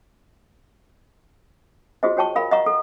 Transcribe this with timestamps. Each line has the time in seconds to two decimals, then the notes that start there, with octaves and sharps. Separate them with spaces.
2.03 F4 F#4 G#4 C5 D#5
2.17 F#4 C#5 G5 A5 C#6
2.36 A#4 F5 B5
2.51 D#5 F5 F#5 A#5 C#6
2.66 A4